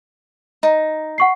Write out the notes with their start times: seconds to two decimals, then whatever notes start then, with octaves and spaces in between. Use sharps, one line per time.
0.63 D#4
1.18 F#5 C#6 C7